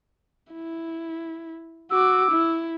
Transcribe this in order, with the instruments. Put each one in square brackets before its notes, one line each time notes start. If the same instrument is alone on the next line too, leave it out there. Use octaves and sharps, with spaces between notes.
[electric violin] E4
[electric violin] F#4 D6 [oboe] E6
[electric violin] E4